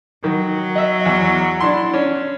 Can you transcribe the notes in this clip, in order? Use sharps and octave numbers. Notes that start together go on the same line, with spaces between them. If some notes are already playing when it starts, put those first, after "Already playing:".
D#3 F#3
D#5 E5
E2
D4 E4 C6
C#4 D4